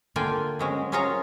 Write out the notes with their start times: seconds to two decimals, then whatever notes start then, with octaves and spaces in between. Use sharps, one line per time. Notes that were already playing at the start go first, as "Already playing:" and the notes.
0.16 D3 A#3 F4 G5 G#5
0.59 F#3 G#3 C#4
0.92 C#4 F4 G#4 A#4 C#5 A#5